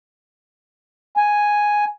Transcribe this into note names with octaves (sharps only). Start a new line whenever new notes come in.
G#5